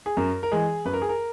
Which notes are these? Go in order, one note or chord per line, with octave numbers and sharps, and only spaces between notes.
G#4
F#2 A#4
A#4
E3 G#3 G#4
F#2 B4
A#4
G#4
A#4